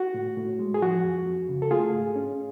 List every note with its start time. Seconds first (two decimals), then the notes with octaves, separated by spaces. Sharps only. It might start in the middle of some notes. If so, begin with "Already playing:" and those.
Already playing: F#4
0.14 A2
0.37 A2
0.59 G#3
0.74 G#4
0.82 F3 F#4
1.04 F2
1.26 F2
1.49 C#3
1.62 A4
1.71 A3 F4 G#4
1.94 G#2
2.16 C#4